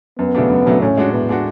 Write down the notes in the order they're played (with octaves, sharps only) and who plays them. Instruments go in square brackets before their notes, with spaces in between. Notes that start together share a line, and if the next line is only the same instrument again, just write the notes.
[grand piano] F#2 [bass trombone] B3
[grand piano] C#3 F#3 A3 D4
F#2
C#3 F#3 A3 D4
[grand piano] A2 [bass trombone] C#4
[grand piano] G#3 D4 F#4
[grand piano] A2 [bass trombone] B3
[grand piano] G#3 D4 F#4